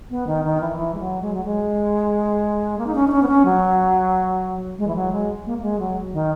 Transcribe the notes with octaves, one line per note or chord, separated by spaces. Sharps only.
B3
D#3
D#3
E3
E3
G#3
F#3
G#3
F#3
G#3
A#3
D#4
C#4
D#4
C#4
B3
C#4
F#3
G#3
E3
F#3
G#3
A#3
A#3
G#3
F#3
D#3